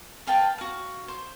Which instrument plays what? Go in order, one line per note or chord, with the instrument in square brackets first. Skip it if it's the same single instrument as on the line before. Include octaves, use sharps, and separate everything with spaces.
[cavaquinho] B4 F5 G5 A5
F#4 F5
C5